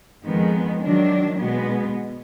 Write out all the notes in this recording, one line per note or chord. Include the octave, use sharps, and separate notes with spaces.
F2 D#3 G#3 B3
D#3 F#3 D4
B2 G#3 B3